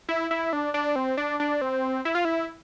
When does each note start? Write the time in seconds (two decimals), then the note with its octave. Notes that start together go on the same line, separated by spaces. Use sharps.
0.09 E4
0.31 E4
0.53 D4
0.74 D4
0.96 C4
1.17 D4
1.40 D4
1.61 C4
2.05 E4
2.15 F4
2.25 E4